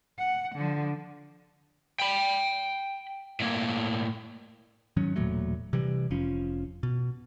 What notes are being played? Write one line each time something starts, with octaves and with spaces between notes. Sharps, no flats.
F#5
D3 F3
G5 B5
A2 A#3
G#2 D#3 F#3 C#4
E1 A#2 F#3 A3
C3 E3 G3
F1 F3 C#4
B2